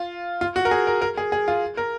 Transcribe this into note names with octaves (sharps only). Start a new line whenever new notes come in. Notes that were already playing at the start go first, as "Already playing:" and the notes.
Already playing: F4
F4
F#4
A#4
G#4
A#4
A#4
G#4
G#4
F4
A#4